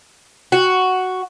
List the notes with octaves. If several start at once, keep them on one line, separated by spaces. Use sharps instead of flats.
F#4